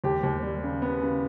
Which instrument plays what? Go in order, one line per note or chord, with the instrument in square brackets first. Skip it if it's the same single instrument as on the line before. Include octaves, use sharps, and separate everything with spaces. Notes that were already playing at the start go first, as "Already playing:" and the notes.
[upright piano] D#2 [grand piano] G4
[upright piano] D#2
G3
C#3
B3
C#3